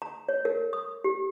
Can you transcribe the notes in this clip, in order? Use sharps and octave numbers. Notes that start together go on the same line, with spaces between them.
A#5
C#5
A#4
D#6
G4